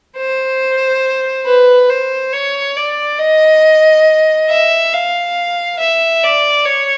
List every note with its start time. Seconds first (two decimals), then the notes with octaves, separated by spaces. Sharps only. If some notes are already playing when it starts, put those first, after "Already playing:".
0.17 C5
1.47 B4
1.90 C5
2.33 C#5
2.77 D5
3.19 D#5
4.50 E5
4.93 F5
5.79 E5
6.23 D5
6.65 C#5